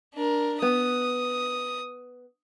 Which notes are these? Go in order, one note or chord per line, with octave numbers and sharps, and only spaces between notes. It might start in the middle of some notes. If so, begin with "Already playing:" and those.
D4 A#4
B3 D#6